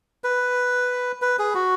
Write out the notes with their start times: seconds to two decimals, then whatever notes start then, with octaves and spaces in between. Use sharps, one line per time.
0.24 B4
1.22 B4
1.39 G#4
1.55 F#4